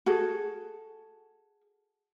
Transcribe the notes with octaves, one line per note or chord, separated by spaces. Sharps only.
F#4 G#4 A4